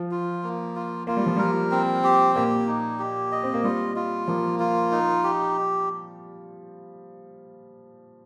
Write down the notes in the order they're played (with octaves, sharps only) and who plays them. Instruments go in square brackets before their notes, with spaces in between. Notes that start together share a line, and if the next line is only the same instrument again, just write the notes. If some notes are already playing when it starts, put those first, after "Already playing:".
Already playing: [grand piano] F3
[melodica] F4
A#3
F4
[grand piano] A#3 [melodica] F4
[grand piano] G3
F3
[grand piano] G3 [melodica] A#4
[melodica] C4
G4
[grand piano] A#2 A#3 [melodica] G4
[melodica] D#4
G4
D#5
[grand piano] C4
A#3
[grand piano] G3 [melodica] F4
[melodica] F4
[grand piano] F3 [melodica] A#3
[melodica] F4
D#4
G4